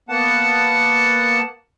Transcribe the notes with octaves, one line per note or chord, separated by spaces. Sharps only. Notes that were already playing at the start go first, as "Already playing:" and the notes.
A#3 B3 F#5 A5